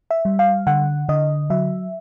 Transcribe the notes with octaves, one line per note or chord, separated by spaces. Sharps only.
E5
G3
F5
D3 F#5
D3 D#5
F#3 E5